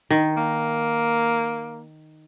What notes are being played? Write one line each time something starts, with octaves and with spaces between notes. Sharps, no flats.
D#3
A#3